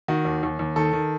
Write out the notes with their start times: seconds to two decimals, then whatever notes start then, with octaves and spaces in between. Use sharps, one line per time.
0.08 D#3 F#4
0.25 D#2
0.43 D#2
0.59 D#2
0.76 D#3 A4
0.93 D#3